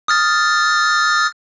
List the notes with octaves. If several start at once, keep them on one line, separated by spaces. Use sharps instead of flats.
D#6 F6 A6